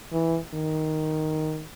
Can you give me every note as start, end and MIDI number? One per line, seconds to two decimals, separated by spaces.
0.13 0.38 52
0.54 1.63 51